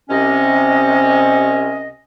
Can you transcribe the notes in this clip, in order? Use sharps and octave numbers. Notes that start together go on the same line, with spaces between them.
C2 C3 C#4 D#5